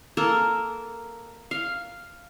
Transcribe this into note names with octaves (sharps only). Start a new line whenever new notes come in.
A#3 A4 A#4
F5